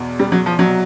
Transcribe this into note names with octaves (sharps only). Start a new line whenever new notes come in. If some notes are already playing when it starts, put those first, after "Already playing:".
Already playing: E2 B2
G3
F#3
F3
C2 B2 F#3